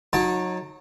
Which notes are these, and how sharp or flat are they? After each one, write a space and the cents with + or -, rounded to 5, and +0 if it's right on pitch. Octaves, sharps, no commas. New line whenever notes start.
F#3 -25 D#4 +0 A5 +5